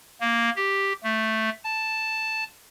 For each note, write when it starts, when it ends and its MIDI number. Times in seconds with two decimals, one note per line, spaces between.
0.21 0.50 58
0.56 0.93 67
1.03 1.49 57
1.64 2.44 81